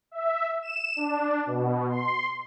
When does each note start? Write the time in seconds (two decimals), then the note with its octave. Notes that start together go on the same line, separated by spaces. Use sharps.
0.11 E5
0.62 E7
0.96 D4
1.46 B2
1.90 C6